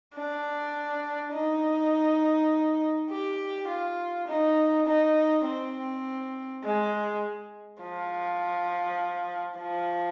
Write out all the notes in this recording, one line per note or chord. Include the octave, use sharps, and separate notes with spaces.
D4
D#4
G4
F4
D#4
D#4
C4
G#3
F3
F3